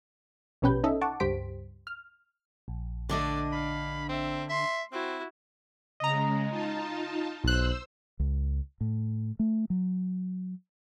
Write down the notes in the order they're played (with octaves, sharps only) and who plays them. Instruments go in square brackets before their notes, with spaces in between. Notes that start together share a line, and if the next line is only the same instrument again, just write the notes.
[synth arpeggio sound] A#1 B2 C#4 G4 B4 G6
C#4 D#4 A4 D#5 E5
F#5 A5 C#6 D6
C#2 G2 G4 C5 B6 D7
F6
[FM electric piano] A#1
[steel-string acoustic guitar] D3 D4 D#5 [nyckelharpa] A3 D5
[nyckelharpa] F5 [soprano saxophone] B5
[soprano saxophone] C4 [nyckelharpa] E5
[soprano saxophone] E5 [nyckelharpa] C6
[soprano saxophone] C4 [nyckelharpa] E4 F#4
[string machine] C#3 G#3 [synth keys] D#5 A#5
[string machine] D#4 F4 A5
[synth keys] B1 F#6 [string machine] C5 E6
[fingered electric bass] C#2
A2
A3
F#3